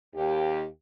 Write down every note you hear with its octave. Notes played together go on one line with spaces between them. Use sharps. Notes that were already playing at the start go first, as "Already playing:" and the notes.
D#2 G4